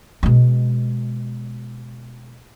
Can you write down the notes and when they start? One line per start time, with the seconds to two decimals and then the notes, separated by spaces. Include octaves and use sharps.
0.23 B2 G#3